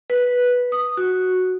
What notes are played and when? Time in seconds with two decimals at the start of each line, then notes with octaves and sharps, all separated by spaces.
0.10 B4
0.72 D#6
0.97 F#4